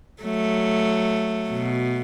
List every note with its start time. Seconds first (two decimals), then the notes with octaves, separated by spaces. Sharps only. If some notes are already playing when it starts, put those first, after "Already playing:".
0.23 F#3 A3
1.50 B2